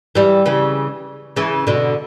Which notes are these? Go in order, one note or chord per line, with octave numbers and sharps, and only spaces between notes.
E3 G3
C#3 E3
C#3 E3
B2 D3